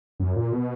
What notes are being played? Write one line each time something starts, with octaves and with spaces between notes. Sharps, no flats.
F#2
A#2
B2